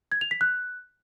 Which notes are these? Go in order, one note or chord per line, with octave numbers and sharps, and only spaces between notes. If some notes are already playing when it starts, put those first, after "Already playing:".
G#6
F7
B6
F#6